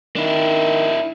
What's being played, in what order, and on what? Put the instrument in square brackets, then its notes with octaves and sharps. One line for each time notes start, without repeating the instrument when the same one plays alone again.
[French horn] D#3 [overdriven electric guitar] D4 E4